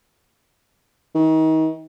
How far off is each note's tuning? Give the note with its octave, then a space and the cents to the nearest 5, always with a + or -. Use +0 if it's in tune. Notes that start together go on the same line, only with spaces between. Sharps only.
D#3 +35